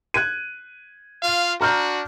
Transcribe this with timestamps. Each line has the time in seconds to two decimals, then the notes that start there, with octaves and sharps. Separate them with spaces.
0.14 F#6 G#6 D#7
1.22 F4 F5
1.61 D4 F#4 A#5 F6 G6